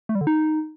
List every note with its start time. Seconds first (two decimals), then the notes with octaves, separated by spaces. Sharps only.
0.09 A3
0.15 G3
0.21 D3
0.27 D#4